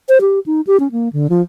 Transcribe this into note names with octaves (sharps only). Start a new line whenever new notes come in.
C5
G4
D#4
G4
C#4
A#3
D3
F3